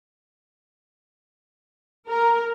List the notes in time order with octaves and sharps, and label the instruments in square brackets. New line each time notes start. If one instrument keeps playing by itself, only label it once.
[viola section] A#4